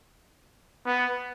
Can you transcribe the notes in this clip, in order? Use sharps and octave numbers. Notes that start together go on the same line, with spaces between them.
B3